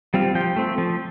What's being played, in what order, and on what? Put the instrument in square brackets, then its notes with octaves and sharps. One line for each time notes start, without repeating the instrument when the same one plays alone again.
[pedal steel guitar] G3 C4 F4
F3 G5
A3 C4
F3